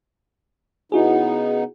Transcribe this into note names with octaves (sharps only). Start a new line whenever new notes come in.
C#3 B3 D#4 E4 F#4 G#4